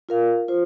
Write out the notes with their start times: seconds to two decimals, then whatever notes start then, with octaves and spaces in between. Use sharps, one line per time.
0.09 F4 A#4 F5
0.48 F4 C5